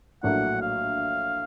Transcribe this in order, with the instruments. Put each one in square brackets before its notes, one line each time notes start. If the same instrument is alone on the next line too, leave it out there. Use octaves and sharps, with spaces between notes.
[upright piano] A#1 A2 F#3 A#3 D4 [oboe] F#5
[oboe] F5